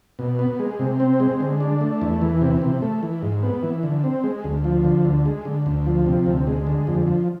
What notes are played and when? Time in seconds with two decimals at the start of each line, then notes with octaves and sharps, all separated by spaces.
0.19 B2
0.39 B3
0.59 G#3
0.79 C3
1.00 C4
1.20 G#3
1.40 D3
1.60 D4
1.81 A3
2.01 E2
2.22 E3
2.41 C3
2.62 C3
2.82 A3
3.03 E3
3.22 G#2
3.43 B3
3.63 E3
3.83 D3
4.04 C4
4.24 G#3
4.44 D2
4.64 F3
4.84 D3
5.05 D2
5.26 G#3
5.45 D3
5.66 D2
5.86 F3
6.06 C3
6.27 D2
6.47 G#3
6.67 D3
6.87 F2
7.07 F3